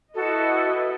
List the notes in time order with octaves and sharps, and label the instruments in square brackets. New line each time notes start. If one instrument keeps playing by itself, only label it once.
[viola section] E4 B4 D#5 [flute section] F#4 A4